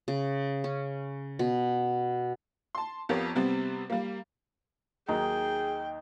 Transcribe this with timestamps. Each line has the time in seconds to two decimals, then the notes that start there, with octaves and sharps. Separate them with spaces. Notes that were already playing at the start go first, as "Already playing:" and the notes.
0.08 C#3
0.64 C#4
1.39 B2
2.75 A5 C6
3.09 F2 F3 B3 G4 A#4 C#5
3.35 C3 G3 B3 C4
3.90 G3 A#3
5.08 D#2 D#3 F#3 D#4 G#4 G5